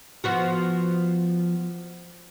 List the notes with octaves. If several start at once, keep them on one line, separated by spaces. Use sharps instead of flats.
F3 B3 F#4